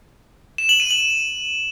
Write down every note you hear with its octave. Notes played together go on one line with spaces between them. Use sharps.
E7
F#7
D#7
F#7